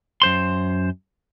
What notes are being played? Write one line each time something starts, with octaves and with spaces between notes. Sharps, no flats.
F#2 C5 C6